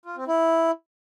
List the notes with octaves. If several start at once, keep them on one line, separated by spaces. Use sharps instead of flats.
F4
C4
E4